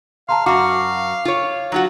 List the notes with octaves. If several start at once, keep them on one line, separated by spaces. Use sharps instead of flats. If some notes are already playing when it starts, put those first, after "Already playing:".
F5 A5 A#5 C6
F#2 F#4 F5 D6
F4 C#5
F#3 F4 F#4